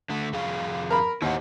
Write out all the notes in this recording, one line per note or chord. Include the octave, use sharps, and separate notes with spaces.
D3 A3
F2 G#4 F5
A#4 B5
D#2 E4 C5 F#5